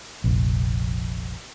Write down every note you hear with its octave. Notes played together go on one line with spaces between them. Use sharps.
F1 A#1